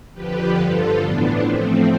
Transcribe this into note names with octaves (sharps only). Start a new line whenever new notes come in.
F2 D3 F3 G4 B4
G2 D3 F3 F4 A4
A2 E3 B3 D4
A2 F3 A3 C4